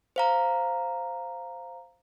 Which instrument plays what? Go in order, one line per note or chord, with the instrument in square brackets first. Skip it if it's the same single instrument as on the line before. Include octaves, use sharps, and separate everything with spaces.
[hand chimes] C5 F5 A#5